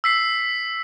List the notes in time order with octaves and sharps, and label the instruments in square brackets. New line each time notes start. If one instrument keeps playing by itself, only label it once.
[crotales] E6 B6 C7